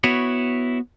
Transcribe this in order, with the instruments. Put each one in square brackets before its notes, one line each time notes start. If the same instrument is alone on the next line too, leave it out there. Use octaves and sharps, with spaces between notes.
[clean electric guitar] B3 E4 F#4 B4 C#5